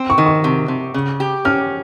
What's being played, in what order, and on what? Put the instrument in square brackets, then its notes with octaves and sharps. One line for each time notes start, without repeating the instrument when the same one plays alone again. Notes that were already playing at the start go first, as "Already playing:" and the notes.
Already playing: [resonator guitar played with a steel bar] C4
[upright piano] C#6
[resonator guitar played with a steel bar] D#3
[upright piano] C#6
[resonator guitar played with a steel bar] C3
C3
C#3
G4
[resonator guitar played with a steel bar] C#4 [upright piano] F6